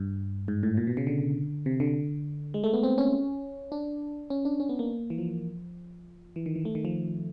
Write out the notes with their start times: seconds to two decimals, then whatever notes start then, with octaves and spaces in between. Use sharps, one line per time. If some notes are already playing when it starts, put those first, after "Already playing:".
Already playing: G2
0.48 G#2
0.63 A2
0.77 A#2
0.87 B2
0.97 C#3
1.07 D3
1.66 C3
1.80 D3
2.54 G#3
2.64 A3
2.73 B3
2.83 C4
2.98 C#4
3.72 D4
4.30 C#4
4.45 D4
4.60 C#4
4.69 B3
4.79 A#3
5.10 E3
5.18 F3
6.36 E3
6.46 D#3
6.56 E3
6.65 A3
6.75 D#3
6.85 F3